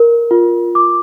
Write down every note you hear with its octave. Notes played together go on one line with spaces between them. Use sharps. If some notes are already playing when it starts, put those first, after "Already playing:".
Already playing: A#4
F4
D6